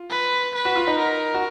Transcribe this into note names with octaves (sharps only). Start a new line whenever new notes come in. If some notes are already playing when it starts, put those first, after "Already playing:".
Already playing: F4
B4
B4
F#4
F4
D#4
A#4
F#4